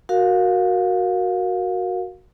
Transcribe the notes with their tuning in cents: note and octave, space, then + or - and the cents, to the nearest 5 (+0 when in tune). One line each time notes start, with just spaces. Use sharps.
F#4 +0 A#4 +0 F5 +20